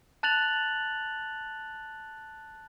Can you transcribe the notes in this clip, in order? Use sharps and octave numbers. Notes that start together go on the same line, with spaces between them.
A5 F#6 A6 F7 F#7